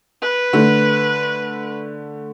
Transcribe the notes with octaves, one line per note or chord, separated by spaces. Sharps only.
B4
D3 A3